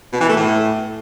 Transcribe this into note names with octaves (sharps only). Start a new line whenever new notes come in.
B2
E3
A3
A2